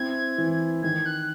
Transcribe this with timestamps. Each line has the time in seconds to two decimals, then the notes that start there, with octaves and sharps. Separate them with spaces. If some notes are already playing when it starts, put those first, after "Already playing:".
Already playing: C4 E4 G#6
0.38 E3
0.83 D#3 G#6
1.06 F#6